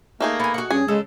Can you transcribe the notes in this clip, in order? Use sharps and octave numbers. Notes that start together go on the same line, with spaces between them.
A3 A#3 D#4 G#4
B3 G#5
F#4 F#5
G2 C#4 G#4
C#3 G#3 A4